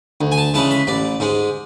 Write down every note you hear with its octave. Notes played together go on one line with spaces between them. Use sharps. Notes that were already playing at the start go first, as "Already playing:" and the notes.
D2
G#5
A5
C#3 E3 G#3 A5
B5
A1 D5
G#2 G#3